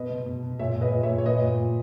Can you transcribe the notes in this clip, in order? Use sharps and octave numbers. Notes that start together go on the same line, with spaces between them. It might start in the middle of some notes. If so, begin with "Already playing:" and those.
Already playing: B2 B4 D#5
B2
B2
B2
A#2 C#5 E5
A#2
B4 D#5
A#2
C#5 E5
A#2
C#5
A#2 B4 D#5
A#2
A#2